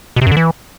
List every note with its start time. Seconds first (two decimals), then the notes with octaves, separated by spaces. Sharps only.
0.16 B2
0.21 C3
0.27 F#2
0.32 D3
0.37 E3